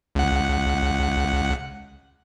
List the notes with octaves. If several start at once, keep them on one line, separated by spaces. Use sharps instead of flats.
C#2 F#5